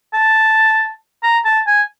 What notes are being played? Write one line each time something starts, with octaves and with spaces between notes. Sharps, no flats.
A5
A#5
A5
G#5